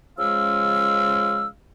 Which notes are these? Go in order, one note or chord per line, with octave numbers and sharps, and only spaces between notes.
C#3 F3 G#3 F5 E6